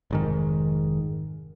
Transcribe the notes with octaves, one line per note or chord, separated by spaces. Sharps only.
F1 G#2 D#3